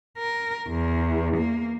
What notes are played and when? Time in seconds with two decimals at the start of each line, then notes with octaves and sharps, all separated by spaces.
0.18 A#4
0.68 E2
1.36 A#3